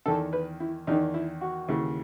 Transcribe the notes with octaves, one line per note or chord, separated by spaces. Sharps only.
E2 D#3 A4
B4
E4
E2 D#3 D#4
E4
F#4
D#2 C#3 E3